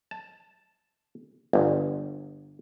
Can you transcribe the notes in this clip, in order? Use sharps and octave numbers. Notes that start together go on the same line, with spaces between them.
A5
G1